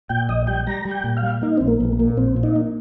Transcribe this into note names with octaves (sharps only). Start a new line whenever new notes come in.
A#2 G5
A#1 D#5
G3 G5
G3 A#5
G3
G5
A#2
F5
G3
A#3 D#4
A#1 C4
A#3
A#1
A#3
A#2
A#1 C4
A#2
D#4
A#3